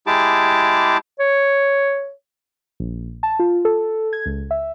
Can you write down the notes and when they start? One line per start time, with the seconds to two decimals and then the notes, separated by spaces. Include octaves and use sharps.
0.07 G#3 E4 G4 G#4 A5 D6
1.19 C#5
2.80 A#1
3.23 A5
3.39 F4
3.65 A4
4.13 G#6
4.26 C#2
4.51 E5